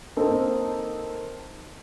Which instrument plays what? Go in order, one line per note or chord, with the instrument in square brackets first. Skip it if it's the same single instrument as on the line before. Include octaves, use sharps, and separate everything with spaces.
[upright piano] A#3 C4 D#4 A4